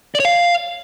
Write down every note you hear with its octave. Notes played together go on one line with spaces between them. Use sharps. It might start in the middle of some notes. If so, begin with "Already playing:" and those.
D5
C#5
F5